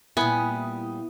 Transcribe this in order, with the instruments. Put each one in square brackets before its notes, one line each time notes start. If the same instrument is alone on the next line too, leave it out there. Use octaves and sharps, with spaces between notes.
[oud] A#2 G3 [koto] B3 [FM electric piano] E4 D#6 [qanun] G#5